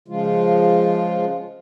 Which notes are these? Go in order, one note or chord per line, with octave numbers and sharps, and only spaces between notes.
C#3 F3 G#3 F4